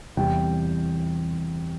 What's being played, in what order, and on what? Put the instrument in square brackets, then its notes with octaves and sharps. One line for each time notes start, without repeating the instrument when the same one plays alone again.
[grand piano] E2 C3 E3 G3 G5